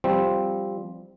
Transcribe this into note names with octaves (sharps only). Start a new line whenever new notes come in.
F3 G3 C4